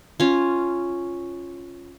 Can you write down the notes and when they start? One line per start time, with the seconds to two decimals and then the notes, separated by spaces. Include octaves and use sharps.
0.20 C#4 F4